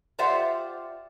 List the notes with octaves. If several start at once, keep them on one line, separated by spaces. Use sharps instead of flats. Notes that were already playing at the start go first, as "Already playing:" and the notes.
F4 G4 C5 D5 E5 F#5